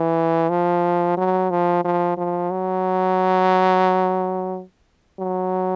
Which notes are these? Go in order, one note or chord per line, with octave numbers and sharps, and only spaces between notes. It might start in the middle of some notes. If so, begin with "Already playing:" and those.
Already playing: E3
F3
F#3
F3
F3
F3
F#3
F#3